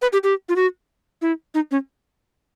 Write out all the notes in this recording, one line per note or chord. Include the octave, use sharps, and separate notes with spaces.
B4
G4
G4
F4
F#4
E4
D#4
C#4